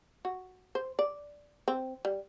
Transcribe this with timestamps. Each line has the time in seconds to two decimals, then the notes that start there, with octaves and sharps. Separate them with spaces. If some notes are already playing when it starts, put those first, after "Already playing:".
0.25 F#4
0.75 C5
0.99 D5
1.68 C4
2.05 G3